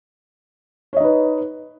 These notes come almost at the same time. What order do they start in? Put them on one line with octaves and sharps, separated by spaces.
C#5 D#5 D#4 B4